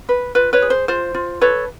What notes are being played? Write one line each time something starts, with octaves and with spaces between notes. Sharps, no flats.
B4
F4 B4
B4 C#5
G#4
C5
F4 C5
F4
A4 B4 C#5